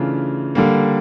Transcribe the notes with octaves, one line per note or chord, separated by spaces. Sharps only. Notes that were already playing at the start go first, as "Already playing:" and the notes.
Already playing: C#3 E3 A3 D4 F4
D3 G3 A#3